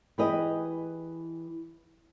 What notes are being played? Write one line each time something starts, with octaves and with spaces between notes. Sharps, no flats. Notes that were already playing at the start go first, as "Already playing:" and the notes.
E3 G4 G#4 B4 D#5